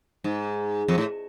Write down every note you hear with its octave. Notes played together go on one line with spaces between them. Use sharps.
G#2
F2
A2